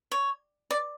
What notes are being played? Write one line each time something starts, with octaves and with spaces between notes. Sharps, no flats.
C#5
D5